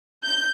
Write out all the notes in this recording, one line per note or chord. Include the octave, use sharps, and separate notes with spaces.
G6